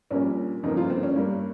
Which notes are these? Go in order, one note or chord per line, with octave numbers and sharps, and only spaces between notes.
A#1 A#2 G3 A#3 C#4
G1 F2 C#3 F3 A#3 D#4
F4
C4
C#4
G2 G3 A#3